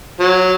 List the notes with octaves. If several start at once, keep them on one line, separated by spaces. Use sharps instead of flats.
F#3